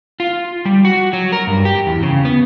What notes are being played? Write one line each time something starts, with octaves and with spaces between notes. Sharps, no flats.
F4
G3
F#4
F#3
A#4
G2
G4
E2
C#3
B3